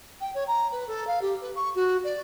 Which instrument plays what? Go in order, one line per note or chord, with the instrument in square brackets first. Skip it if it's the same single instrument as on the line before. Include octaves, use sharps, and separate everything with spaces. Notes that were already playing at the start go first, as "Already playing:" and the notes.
[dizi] G5
C#5
A#5
B4
A4
F5
G4
B4
C#6
F#4
D5